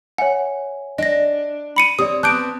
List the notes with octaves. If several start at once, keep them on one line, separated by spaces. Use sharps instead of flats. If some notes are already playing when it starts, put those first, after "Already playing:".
C#5 E5 F#5 G#5
D4 D#5 A#6
B5 C#7 D#7
C4 G4 C#5 D5 D#6
B3 C4 A5 D6 D#6 F#6 G6 D7